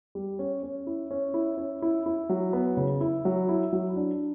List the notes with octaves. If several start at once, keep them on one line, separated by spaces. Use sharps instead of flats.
G3
C#4
C#4
E4
C#4
E4
C#4
E4
E4
F#3
B3
C#3
E4
F#3
E4
F#3
D4